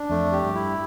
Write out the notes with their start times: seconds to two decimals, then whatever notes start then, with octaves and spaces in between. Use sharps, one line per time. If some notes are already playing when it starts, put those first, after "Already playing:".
Already playing: D4
0.10 F2 A3
0.32 G4
0.44 G2
0.55 E4